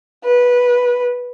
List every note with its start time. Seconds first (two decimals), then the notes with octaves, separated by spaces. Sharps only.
0.23 B4